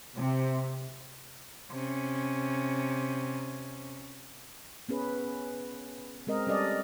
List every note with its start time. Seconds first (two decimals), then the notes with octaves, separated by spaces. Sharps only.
0.18 C3
1.72 C3 C#4
4.89 B3 C#4 G#4 B4
6.27 G#3 C4 A#4 D#5
6.47 G3 C#4 A4 D5 D#5